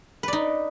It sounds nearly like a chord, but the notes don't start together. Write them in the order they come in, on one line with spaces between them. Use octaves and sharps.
B4 D5 D#4